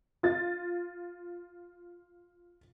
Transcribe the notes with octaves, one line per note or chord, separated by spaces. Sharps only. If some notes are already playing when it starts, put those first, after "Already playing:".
F4 A6